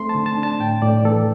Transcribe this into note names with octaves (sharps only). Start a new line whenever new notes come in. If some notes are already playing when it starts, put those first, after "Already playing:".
Already playing: A3 C4 C6
A5
D3
A5
D4
A5
A2 G5
A2 D5
E3 A4